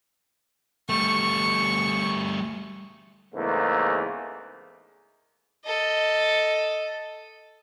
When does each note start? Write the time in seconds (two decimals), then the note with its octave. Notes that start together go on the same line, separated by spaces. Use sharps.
0.89 G3 A3 C#6
3.35 E2 G#2 C#3 A3 A#3
5.65 A4 D#5